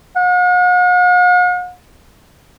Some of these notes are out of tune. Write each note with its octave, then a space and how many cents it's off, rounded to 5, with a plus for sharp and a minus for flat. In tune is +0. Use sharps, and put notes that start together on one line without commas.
F#5 -45